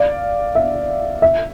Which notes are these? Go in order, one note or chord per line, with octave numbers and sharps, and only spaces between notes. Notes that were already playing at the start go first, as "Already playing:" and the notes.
Already playing: D5 F5
E5
E5